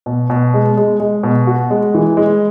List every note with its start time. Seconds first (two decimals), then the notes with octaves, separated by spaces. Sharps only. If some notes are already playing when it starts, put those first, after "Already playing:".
0.06 B2
0.30 B2
0.54 G#3
0.77 G#3
1.00 G#3
1.23 B2
1.47 F#4
1.70 G#3
1.95 E3
2.17 G#3